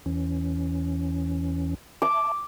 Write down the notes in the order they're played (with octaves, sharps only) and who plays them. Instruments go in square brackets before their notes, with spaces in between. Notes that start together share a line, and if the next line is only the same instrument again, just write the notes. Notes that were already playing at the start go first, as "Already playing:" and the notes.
[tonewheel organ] E2 E3 C#4
[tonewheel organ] E5 A5 [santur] D6